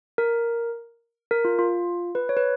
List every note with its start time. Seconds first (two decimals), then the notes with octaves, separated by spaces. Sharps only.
0.18 A#4
1.31 A#4
1.45 F4
1.59 F4
2.15 B4
2.29 C#5
2.37 B4